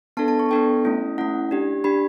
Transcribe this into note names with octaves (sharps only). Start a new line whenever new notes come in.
B3 D4 A4 A5
A5
C#6
B3 D4 A4 G5
A3 C#4 E4
A3 C#4 E4 F#5
D4 G4
D4 G4 B5